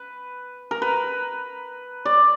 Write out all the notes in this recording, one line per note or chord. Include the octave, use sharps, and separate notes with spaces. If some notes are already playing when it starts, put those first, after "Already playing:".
Already playing: B4
A#4
B4
D5